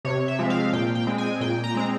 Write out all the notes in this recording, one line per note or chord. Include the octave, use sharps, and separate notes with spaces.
C3 C#5
E5
F3 G#3 C4
F5
A#2 G5
G5
G#3 C4
G#5
A#2 G5
A#5
G#3 C4